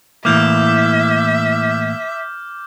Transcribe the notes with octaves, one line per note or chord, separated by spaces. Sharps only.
A2 E3 A#3 E5 D6 F6 G6